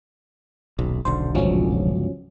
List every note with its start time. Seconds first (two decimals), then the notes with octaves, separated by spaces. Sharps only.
0.79 D#1 B1
1.05 D#1 B1 D3 C5
1.35 G1 C#2 F3 F#3 C#4